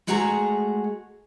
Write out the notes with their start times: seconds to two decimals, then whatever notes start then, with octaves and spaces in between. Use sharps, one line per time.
0.07 G#3 A3 F#4 G#4 G5 A#5